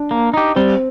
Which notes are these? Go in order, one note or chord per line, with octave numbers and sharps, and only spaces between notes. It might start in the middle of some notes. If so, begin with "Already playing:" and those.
Already playing: D4
A#3
D#4 G4
G3 C4